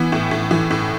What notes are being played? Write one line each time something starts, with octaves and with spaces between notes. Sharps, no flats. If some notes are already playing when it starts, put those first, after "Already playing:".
Already playing: E3 B3
A2
A2
E3
A2